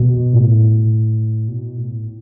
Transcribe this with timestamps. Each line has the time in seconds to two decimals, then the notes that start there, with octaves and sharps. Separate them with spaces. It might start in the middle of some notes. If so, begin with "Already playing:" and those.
Already playing: B2
0.33 A2
1.48 B2
1.77 A2